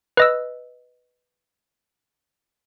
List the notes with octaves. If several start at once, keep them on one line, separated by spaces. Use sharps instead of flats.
B4 D#5 E6